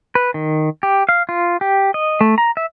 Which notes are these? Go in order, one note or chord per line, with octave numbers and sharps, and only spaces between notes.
B4
D#3
G4
F5
F4
G4
D#5
A3
A#5
E5